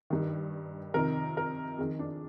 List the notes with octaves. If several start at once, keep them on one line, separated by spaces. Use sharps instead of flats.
G2 D#3
F2 C3 D#3 A#4
A#4
F2 D#3 G#4
D4